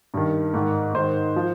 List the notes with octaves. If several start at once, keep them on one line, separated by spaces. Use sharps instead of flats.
G2 D#3
G#2 D#3
G#2 D#3 C5
F3